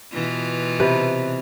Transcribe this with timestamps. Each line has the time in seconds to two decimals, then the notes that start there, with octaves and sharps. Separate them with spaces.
0.14 B2 E3 F4
0.80 C3 B4